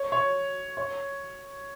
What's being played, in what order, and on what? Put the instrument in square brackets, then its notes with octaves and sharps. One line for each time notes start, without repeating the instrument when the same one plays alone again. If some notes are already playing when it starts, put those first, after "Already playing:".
Already playing: [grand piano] C#5
C#5
C#5